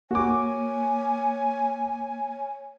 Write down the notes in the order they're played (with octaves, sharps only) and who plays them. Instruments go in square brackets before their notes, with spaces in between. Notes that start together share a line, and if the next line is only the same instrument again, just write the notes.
[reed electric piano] A#3 [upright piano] F#4 D6 [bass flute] C#5 [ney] G#5